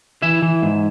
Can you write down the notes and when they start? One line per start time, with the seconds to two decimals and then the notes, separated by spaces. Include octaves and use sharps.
0.22 E3 E4 E5
0.42 E3
0.62 G#2